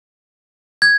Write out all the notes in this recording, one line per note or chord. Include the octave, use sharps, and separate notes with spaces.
G#6